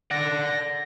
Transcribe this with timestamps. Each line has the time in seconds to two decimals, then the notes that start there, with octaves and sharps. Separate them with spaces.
0.11 D5 F#5 A#6